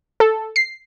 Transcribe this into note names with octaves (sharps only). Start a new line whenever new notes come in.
A4
C7